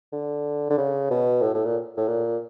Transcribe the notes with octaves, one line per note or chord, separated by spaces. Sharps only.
D3
D3
C#3
B2
A2
A2
A#2
A2
A#2